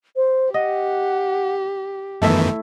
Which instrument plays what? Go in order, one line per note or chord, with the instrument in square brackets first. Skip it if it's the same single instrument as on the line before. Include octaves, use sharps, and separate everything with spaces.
[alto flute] C5
[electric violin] G4 [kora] D#5 [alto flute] F#5
[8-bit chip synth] F#2 D#3 E3 [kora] A3 E4 E5 [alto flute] B3